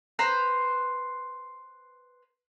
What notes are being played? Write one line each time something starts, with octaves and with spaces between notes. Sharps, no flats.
B4 C5 A#5